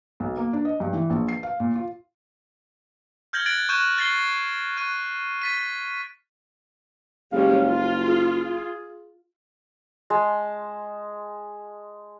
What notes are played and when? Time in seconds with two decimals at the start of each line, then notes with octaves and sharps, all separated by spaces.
0.20 B1
0.37 A#3
0.53 D4
0.65 D#5
0.80 G2
0.93 E3
1.10 A#1
1.28 C7
1.43 F5
1.60 A#2
1.76 F4
3.33 F6 G6 G#6 A#6 F#7 G7
3.46 F#6 G#6 A6 D7 F#7
3.69 C#6 F#6 G6 D#7 E7
3.98 F#6 A6 A#6 C7 F#7 G7
4.77 C#6 F#6 D#7
5.42 A6 B6 D#7
7.32 F#1 G3 G#3 C#4 F5
7.66 F4
8.06 G#4
10.10 G#3 A5